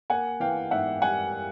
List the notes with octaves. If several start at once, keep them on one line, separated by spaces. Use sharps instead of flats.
A#3 F#5 G#5
E3 F5 G5
G#2 E5 F#5
G3 F#5 G#5